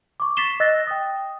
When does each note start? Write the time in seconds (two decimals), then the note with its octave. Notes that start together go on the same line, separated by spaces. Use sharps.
0.20 C#6 D6
0.37 A6 B6 C7 E7 G7
0.60 D#5 E6 F#6 A6 A#6
0.87 G5 D#6